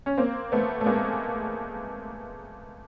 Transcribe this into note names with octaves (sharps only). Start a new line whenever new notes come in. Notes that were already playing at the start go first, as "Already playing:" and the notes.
C#4
A#3 C4
A3 B3
A3
G#3 A#3